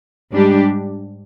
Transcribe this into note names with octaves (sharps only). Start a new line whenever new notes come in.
G#2 G3 D4 G4